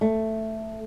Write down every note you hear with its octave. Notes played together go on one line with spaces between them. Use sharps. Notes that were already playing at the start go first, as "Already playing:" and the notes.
A3